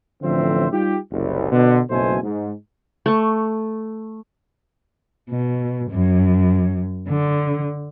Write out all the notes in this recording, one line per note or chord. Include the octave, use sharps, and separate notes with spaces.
A1 D3 F3 C4 C5 E5
G3 D#4 F4 G4
F#1 C2
B2 D3
F#1 B1 B2 A3 C5 G#5
G#2
A3 C#6
B2
F#2
D3